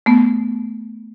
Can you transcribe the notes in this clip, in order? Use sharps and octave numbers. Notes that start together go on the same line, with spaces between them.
A3 B3